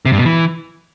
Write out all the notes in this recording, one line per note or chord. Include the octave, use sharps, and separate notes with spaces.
C3
G2
B2
E3